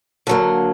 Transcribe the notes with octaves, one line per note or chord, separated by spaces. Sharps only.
D3 F#3 A#3